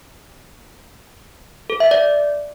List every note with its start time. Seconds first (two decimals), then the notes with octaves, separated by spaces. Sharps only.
1.70 A4
1.80 E5
1.91 D5